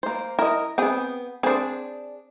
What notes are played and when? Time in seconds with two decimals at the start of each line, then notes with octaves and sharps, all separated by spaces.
0.03 A#3 C5
0.39 E4 A#4 D#5
0.78 B3 C4 G#4 G5
1.43 C4 D4 G#4 C5